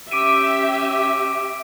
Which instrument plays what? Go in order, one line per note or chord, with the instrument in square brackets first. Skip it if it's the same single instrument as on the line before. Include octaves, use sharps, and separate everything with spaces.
[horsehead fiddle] C#4 G4 [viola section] E5 [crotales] D6 D7 D#7